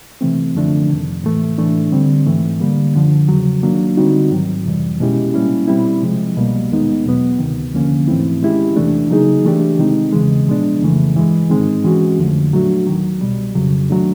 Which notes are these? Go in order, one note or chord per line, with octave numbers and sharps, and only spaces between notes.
C3 E3 A3 C4
F#2 D3 F3 A3 D4
F2 C3 D#3
A2 E3 A3
A2 E3 A3 D4
D3 G3 C4
G#2 E3 A3
D3 G3 A#3
F#2 D3 F3
E2 C#3 F#3
D#3 F#3 A#3 D4
D3 G3 C4 D#4 F#4
G#2 D#3 F#3
F2 C3 E3 G3
B2 G#3 C#4 E4 G4
A#2 G3 A#3 C#4 E4
B2 G3 C4 E4
C3 F3 G#3
C2 B2 G3 A#3
D#2 D#3 G#3 B3 D#4
E2 B2 F#3 B3
D2 C3 D#3
D#2 D3 F3 A#3 C#4
G#2 E3 A3 C4 E4
D#3 G#3 C#4 E4 G4
E2 C3 E3 A3 D4
C#3 F#3 A#3 D#4 G#4
E3 A3 D4 G4
C3 D#3 G#3 C4 D#4
E2 C#3 E3 G#3
A#2 F3 G#3 B3 D4
F2 C#3 E3 A3
G2 E3 G#3
G#2 D#3 G#3 C4 D#4
E3 G#3 C#4 F#4
F2 D3 F3 A3
A#2 F#3 A3 D4 F#4
D#2 D#3 F#3
C2 B2 G3
F2 C#3 F#3
D#3 F#3 A3 D4